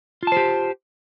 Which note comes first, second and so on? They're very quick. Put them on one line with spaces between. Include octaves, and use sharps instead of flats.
F4 A5 C5 G4